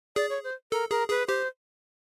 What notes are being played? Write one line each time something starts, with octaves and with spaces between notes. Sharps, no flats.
G#4 D5
C#5
C5
A4 A#4
G#4 A#4
G#4 B4
G4 C5